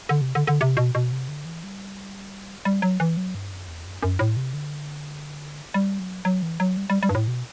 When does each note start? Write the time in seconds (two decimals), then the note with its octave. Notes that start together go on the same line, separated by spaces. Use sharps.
0.09 D3
0.21 C3
0.35 D3
0.47 D3
0.61 C3
0.77 B2
0.95 B2
1.12 C3
1.28 D3
1.45 E3
1.64 G3
2.65 G3
2.82 F#3
3.00 E3
3.17 F#3
3.35 G2
3.52 F#2
3.68 E2
3.85 F#2
4.03 F#2
4.19 A2
4.37 C3
4.54 D3
5.74 G3
6.00 F#3
6.25 F#3
6.42 E3
6.60 F#3
6.77 G3
6.90 G3
7.03 G3
7.09 G2
7.15 A2
7.28 B2